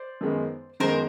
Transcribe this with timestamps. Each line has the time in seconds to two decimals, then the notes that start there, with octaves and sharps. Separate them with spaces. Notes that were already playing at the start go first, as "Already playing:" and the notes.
Already playing: C5 D5
0.21 F#2 D#3 G#3 B3
0.80 F#2 D#3 G#3 B3 A#4 C5